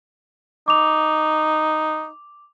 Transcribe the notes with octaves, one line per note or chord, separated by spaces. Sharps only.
D#4 D6 F7